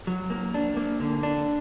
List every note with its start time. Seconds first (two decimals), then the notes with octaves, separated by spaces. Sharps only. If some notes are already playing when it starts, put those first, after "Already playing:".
0.07 F#3
0.30 A#3
0.54 D4
0.77 A#3
1.00 D3
1.23 D4